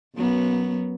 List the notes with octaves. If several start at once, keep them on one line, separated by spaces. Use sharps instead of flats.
F#2 F#3 B3